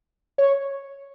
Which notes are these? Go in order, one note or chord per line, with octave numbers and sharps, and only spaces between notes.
C#5